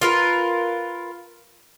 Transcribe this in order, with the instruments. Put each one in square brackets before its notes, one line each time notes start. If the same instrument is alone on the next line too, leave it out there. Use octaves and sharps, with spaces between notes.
[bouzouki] F4 A#4 B4